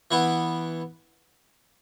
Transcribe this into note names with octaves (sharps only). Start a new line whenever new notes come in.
E3 B3 E4